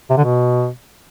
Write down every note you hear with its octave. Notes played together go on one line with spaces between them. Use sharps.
C3
D3
B2